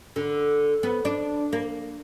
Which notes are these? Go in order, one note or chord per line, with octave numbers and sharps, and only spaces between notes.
D3
B3
D4
A#3